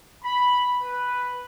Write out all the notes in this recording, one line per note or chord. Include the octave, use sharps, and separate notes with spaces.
B5
B4